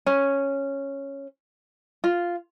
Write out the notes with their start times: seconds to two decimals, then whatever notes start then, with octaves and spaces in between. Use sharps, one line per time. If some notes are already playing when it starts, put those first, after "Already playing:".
0.06 C#4
2.04 F4